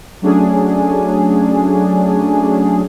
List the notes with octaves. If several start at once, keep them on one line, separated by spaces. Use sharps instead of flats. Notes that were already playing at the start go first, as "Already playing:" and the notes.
F#3 A3 C#4 D4 G#4